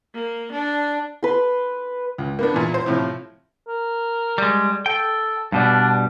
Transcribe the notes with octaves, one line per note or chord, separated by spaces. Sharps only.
A#3
D4
B4 C6
C#2
A#3 B3 D4
E2 A#2
C5
A2 C3 F3
A#4
G3 G#3
A4 G5
G2 B2 G3 D4